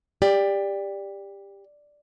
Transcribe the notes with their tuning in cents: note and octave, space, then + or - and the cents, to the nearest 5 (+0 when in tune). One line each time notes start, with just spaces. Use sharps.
G4 +20 D5 +0